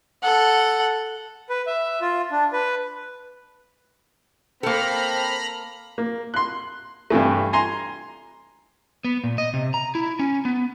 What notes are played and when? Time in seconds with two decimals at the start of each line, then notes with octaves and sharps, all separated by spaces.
0.22 A4 F#5
1.49 B4
1.67 E5
2.01 F4
2.31 D4
2.53 B4
4.63 A#3 C4 A4 A#5 B5 F6
5.98 A#3
6.34 C6 F#6
7.10 G2 C3 E3 A3
7.53 G#5 A#5 C6
9.05 B3
9.24 A#2
9.38 D#5
9.54 C3
9.74 A#5
9.95 E4
10.19 C#4
10.45 B3